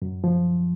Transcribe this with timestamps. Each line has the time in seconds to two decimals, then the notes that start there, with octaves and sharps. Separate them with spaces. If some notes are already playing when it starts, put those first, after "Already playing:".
0.02 F#2
0.24 F3